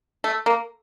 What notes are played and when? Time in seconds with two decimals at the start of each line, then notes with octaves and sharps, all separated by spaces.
0.24 A3
0.46 A#3